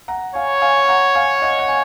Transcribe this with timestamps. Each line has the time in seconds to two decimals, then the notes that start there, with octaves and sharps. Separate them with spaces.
0.08 F#5 A#5
0.35 C#5 F5 G#5
0.62 F5 G#5
0.88 F#5 A#5
1.15 F5 G#5
1.42 D#5 F#5
1.58 F#5
1.69 G#5